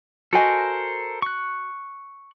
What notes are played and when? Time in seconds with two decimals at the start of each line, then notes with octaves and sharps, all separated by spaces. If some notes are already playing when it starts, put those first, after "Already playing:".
0.33 F#4 A4 A#4 C5 D#5 G#5
1.22 C#6 F#6